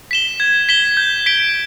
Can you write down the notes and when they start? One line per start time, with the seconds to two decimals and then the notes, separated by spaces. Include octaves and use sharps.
0.11 B6 E7 G7
0.40 G#6
0.69 B6 E7 G7
0.97 G6
1.26 B6 D7 G7